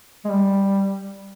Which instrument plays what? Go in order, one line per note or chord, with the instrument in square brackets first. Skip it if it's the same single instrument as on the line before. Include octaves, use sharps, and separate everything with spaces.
[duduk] G#3
G3